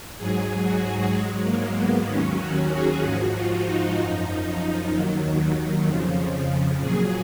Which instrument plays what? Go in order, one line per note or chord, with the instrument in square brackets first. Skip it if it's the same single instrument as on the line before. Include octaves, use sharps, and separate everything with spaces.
[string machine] G#2 F#3 G#4
F#4
G#2 F#3 G#3
A#3
B3
D#2 D#3 F#3 C#4
F#4
G#4
G#2 F3 F#4
F4
D#4
F#2 F3
D#2 D#3 F#3
F2 C#3 F3
A#2 F#3 G#4